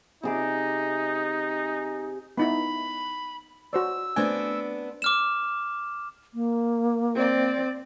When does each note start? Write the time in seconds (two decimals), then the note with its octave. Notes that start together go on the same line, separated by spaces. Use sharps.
0.23 C3 D#4 G#4 D6
2.38 B3 D#4 E4 B5
3.73 F#4 C5 D5 E6
4.16 A3 B3 C4 D4 G#5
5.02 D6 F6 E7
6.34 A#3
7.15 C4 D5